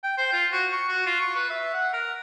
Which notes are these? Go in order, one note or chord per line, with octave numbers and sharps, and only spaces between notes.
G5
C5
F4
F#4
C#6
F#4
F4
C#6
B4
E5
F#5
A#4